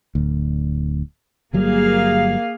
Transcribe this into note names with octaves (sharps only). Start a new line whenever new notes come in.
D1 D2
G1 F#3 G3 A#3 G#4 F5